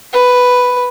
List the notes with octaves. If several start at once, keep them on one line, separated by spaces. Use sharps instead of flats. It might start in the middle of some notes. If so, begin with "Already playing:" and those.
B4